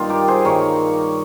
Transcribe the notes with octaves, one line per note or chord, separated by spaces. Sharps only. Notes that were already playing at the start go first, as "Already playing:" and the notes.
Already playing: G2 D#3 A#3 D#4 F4
G4 A#4
G#4 C5
G2 D#3 A#3 A#4 C#5